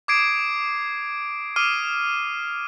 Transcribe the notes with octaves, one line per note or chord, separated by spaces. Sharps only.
D6 D#6 G#6 C7 D7
D6 D#6 F6 C7 D#7